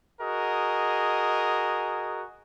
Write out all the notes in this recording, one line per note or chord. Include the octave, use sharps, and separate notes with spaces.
F#4 G#4 A#4 D#5